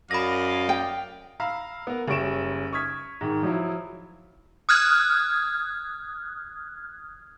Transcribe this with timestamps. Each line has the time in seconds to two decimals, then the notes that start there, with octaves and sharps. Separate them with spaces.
0.11 F#2 D5 D#5 F5 B5 A#6
0.69 G5
1.40 F5 A#5 B5 E6
1.87 B3 A#4
2.08 F#1 F#2 G3 C#6 D7 E7
2.73 C#6 D#6 F6 G#6 B6
3.21 G#2 D#3
3.42 F3 F#3 E4
4.69 D#6 F6 F#6 G#6